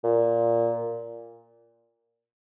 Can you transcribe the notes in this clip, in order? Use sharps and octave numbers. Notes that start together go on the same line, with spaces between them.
A#2